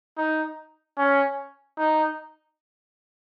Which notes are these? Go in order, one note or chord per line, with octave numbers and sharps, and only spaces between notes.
D#4
C#4
D#4